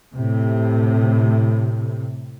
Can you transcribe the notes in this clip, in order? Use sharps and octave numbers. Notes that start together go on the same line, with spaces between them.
A2 C3